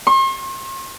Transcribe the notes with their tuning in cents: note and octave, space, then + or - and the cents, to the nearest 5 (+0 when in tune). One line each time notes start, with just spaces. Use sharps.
C6 +45